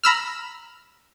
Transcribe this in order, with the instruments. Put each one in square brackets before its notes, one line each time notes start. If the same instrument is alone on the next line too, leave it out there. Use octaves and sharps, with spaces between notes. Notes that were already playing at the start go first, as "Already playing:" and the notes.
[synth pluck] A#5 B5 E6 F6